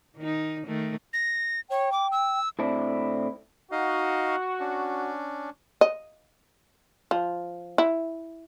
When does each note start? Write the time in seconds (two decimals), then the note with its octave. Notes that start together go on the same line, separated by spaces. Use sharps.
0.17 D#3 D#4
0.66 D#3 A3
1.13 A#6
1.70 C#5 G5
1.92 D6
2.12 E6
2.59 A2 C4 D4 E4
3.72 D#4 F#4 D#5 F5
4.60 C#4 D4
5.81 D#5
7.11 F3
7.78 E4